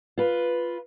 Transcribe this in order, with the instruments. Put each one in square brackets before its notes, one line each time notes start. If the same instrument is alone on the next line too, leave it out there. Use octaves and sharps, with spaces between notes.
[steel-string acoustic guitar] F4 B4